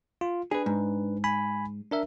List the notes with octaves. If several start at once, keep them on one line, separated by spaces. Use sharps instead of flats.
F4
D4 G#4 B4
G#2
G#5 B5
D4 A#4 E5